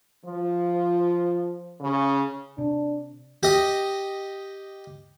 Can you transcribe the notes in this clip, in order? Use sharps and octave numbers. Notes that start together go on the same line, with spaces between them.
F3
C#3
C3 D4
G4 D#5